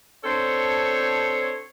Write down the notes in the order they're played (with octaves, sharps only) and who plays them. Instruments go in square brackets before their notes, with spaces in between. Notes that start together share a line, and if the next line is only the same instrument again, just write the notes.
[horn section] C4 D4 A4 C5 C#5